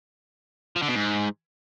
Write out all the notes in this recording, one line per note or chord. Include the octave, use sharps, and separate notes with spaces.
F3
D3
B2
G#2